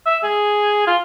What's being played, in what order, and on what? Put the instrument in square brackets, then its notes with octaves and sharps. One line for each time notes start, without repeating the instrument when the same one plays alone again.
[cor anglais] E5
G#4
F4